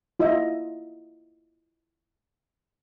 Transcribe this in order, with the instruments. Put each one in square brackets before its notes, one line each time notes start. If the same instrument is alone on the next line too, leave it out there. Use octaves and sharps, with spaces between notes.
[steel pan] E4 F4 D#5 E5